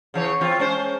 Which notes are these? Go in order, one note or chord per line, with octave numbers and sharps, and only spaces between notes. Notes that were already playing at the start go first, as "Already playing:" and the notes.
C#3 E3 C#5
E3 C4 F4
G#3 C#4 C5